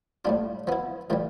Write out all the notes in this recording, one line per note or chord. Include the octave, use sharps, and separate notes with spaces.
A2 G3 D4 F4
F3 B3 E4
A2 E3 G3 F4